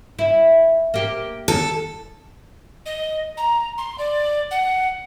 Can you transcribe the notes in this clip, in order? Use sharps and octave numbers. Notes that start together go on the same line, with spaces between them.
E4
A#3 G4
A4
D#5
A#5
C6
D5
F#5